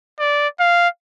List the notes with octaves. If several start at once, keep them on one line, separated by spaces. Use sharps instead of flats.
D5
F5